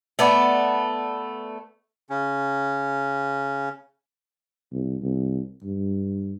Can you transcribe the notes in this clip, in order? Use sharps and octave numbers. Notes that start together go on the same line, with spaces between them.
A3 B3 D5
C#3 C#4
C2
C2
G2